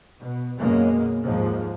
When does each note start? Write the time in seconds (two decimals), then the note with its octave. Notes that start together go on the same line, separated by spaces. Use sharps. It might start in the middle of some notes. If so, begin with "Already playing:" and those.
0.18 B2
0.59 F#2 B2 G#3 A#3
1.23 D#2 G#2 F3